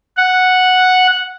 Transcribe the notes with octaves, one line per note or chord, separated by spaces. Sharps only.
F#5